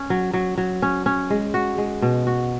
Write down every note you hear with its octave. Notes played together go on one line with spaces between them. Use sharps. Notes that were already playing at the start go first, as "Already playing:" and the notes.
Already playing: C#4
F#3
F#3
F#3
C#4
C#4
G#3
F#4
G#3
B2
F#4